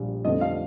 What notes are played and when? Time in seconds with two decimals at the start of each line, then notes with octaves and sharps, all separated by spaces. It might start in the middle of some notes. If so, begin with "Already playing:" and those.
Already playing: A#1 A#2 G3
0.24 F1 F2 D3 G3 D#5
0.41 F5